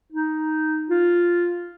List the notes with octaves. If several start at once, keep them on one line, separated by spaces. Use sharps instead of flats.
D#4
F4